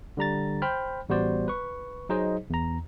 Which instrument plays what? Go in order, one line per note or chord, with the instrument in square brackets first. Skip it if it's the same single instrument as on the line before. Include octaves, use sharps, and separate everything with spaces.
[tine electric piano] D3 G3 A#5 A6
C5 G5 B5 F6 G6
A1 G3 B3 F#4 C5 D5
B4 C#6
F#3 D#4 G#4 C5 D#5
E2 A#5